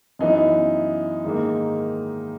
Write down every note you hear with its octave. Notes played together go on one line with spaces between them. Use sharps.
F#2 E3 B3 D#4
G#2 D#3 A#3